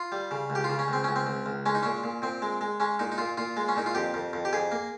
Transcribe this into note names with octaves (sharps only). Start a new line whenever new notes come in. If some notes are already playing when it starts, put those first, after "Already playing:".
Already playing: F4
G3
C#3
C#2
G4
F4
C#3
C#4
C#2 C4
C#2 C#4
C4
C#2
C#2
G#3 C#4
D#4
A#2 C#4
A#2
A#2 C4
G#3
G#3
G#3 C#4
A#2 D#4
D#4
A#2 F4
A#2 F4
G#3
C#4
A#2 D#4
F4
F2 G4
F2
F2
G4
F2 G#4
A#3